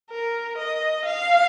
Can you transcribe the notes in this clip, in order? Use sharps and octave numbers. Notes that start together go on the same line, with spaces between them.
A#4
D#5
F5